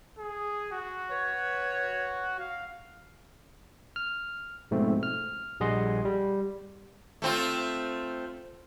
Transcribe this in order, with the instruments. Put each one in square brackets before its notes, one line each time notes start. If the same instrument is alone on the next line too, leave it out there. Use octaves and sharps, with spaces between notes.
[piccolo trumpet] G#4
F#4
[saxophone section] B4 C#5
[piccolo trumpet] F5
[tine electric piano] F6
G#2 B2 F3 A3 C4
F6
A#1 G3 G#4 D#5 F#5 C6
G3
[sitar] A3 C4 F4